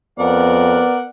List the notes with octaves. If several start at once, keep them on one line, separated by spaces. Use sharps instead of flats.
F2 B3 A#4 D5 F#5